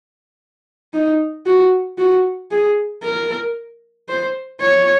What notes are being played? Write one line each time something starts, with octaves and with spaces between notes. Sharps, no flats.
D#4
F#4
F#4
G#4
A#4
C5
C#5